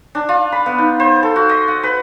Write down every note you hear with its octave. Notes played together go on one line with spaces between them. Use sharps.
D4
F4
B5
B3
D#4
C5
A4
F#4
D#5
F#5
B4